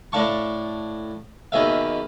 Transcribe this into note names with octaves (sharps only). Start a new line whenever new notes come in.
A2 D4 F5 A5 C#6
D#2 B2 G#4 E5 F5